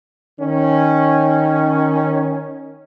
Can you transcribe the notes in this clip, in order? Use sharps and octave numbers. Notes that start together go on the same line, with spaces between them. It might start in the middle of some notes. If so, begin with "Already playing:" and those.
D#3 C#4